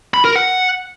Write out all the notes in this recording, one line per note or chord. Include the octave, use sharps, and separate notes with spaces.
B5
A#4
F#5